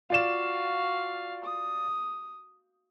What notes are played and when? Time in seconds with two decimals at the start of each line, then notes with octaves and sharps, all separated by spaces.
0.10 F4 F#4 D5 F5 E7
1.44 D#6